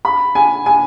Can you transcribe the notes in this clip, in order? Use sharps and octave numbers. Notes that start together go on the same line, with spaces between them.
B5
G#5
G#5